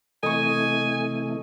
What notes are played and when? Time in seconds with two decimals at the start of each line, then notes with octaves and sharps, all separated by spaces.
0.23 C3 E3 A3 A4 D#5 G#5 C#6